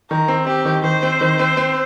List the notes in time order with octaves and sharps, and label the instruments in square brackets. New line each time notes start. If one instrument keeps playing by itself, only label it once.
[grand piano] D#3 [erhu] A#4
[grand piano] C4
[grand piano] C4 [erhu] G4
[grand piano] D#3
[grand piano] D#3 [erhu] C5
[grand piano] C4
D#3
C4
C4